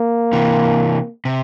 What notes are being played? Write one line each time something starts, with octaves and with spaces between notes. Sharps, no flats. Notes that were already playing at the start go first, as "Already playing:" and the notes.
Already playing: A#3
C3 E3
C3